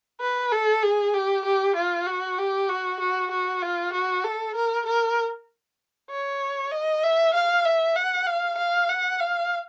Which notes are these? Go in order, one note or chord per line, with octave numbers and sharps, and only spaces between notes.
B4
A4
G#4
G4
G4
F4
F#4
G4
F#4
F#4
F#4
F4
F#4
A4
A#4
A#4
C#5
D#5
E5
F5
E5
F#5
F5
F5
F#5
F5